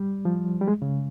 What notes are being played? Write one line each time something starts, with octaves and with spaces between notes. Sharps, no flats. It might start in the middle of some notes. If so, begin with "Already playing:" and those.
Already playing: G3
F3
G3
G#3
C#3